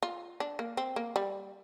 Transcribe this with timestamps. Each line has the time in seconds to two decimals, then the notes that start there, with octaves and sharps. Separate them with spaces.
0.03 F4
0.40 D4
0.59 A#3
0.77 C4
0.96 A#3
1.16 G3